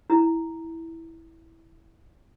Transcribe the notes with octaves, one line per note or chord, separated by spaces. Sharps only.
E4 A#5